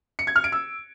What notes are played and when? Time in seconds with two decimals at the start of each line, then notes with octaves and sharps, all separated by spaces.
0.19 C#7
0.27 G#6
0.36 F6
0.44 D7
0.52 E6